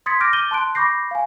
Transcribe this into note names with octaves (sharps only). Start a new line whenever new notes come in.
C6 D#6 G#6 A6 B6 C#7
D6 F6 G6 A6 A#6 D7
D6 G6 A6 D#7 G7
A5 C6 F#6 D7
B5 C#6 D6 G6 A#6 C7
F5 G#5